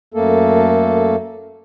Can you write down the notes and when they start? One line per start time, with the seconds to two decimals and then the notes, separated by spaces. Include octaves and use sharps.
0.14 F#2 A3 A#3 A4